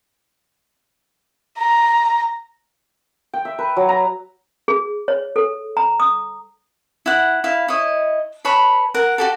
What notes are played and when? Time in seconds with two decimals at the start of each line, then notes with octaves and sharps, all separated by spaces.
1.58 A#5
3.34 G5
3.45 E5
3.59 B4
3.77 F#3
3.89 A#5
4.68 G#4
5.08 C#5
5.36 A4
5.77 A#5
6.00 D#6
7.06 E4 F#5
7.44 E4 F5
7.68 E4 C#5 D#5
8.45 B4 C#5 A5 B5
8.94 A#4 F#5
9.18 F#4 G4 A4